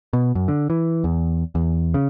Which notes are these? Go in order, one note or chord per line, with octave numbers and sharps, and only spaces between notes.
B2
F#2
D3
E3
E2
E2
C#3